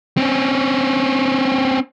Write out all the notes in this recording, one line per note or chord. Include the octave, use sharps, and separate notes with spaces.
C4 C#4